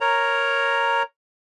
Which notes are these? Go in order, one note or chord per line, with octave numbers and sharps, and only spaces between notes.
A#4 C#5 A#5